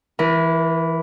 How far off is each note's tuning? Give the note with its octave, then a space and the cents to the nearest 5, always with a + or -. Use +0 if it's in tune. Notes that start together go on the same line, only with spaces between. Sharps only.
E3 +0 A#4 +40